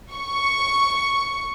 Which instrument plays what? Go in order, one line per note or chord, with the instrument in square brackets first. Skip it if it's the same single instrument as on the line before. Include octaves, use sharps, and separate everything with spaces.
[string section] C#6